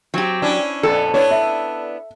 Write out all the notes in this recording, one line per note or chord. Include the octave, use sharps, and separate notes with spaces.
F#3 C4 G4
C#4 D4 E4
F2 A#2 B3 A4
B3 D4 E4 C#5
E5